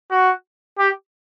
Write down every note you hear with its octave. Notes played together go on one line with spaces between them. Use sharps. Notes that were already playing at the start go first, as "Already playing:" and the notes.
F#4
G4